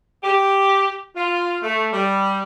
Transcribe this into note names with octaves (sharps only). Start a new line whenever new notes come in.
G4
F4
A3
G3